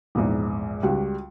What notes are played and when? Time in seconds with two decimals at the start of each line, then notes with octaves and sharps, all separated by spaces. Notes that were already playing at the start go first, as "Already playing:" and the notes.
0.15 A#1 E2 G#2
0.83 C#2 G3 F#4